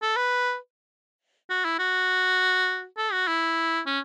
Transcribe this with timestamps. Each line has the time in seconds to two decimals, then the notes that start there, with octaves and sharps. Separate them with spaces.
0.02 A4
0.16 B4
1.50 F#4
1.65 E4
1.79 F#4
2.97 A4
3.12 F#4
3.28 E4
3.86 C#4